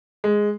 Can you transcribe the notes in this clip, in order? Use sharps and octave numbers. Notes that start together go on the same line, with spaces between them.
G#3